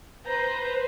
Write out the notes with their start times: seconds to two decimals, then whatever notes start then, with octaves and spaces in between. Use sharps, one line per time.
0.24 B4 C5 A#5 G6